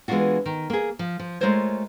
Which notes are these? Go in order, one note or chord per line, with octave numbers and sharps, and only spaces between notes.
E3 G#3 B3 D4 F4 F#4
D#3
A#3 G#4
F3
F3
G#3 A3 F4 A#4 C5 C#5